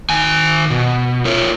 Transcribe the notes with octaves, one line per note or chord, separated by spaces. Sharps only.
D#3 G#5
B2
F4 A#4 C#5